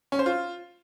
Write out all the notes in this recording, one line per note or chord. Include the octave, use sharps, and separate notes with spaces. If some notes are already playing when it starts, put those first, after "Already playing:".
C#4
C5
F4